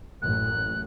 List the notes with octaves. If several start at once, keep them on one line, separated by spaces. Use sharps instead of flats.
A1 F#2 A#2 F#6